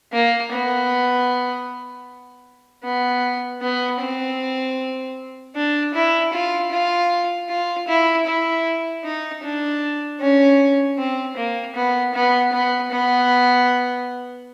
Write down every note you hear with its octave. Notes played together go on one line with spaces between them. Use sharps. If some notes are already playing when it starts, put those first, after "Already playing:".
A#3
B3
B3
B3
C4
D4
E4
F4
F4
F4
E4
E4
D#4
D4
C#4
C4
A#3
B3
B3
B3
B3